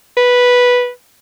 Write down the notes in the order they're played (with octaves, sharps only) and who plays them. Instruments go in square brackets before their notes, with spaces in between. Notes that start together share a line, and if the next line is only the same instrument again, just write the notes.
[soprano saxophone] B4